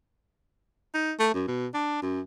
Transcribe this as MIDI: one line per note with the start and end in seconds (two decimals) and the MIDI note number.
0.94 1.12 63
1.20 1.31 57
1.34 1.45 42
1.48 1.67 47
1.74 2.00 62
2.02 2.21 42